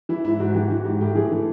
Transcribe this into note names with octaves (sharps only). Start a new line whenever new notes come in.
E3 E4
G#2 E4
G#2 F#4
E3 G4
E3 F#4
G#2 G4
A2 G4
E3 G#4
E3 A4